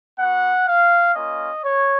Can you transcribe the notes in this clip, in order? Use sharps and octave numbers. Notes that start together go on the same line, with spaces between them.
B3 F#4 F#5
F5
A#3 C#4 F4 D#5
C#5